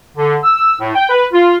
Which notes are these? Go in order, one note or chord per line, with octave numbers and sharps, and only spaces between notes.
D3
E6
A2
G5
B4
F4